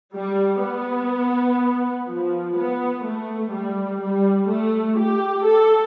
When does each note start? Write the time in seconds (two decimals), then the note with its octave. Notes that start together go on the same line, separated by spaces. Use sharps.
0.14 G3
0.62 B3
2.07 F3
2.56 B3
3.04 A3
3.52 G3
4.01 G3
4.49 A3
4.98 G4
5.46 A4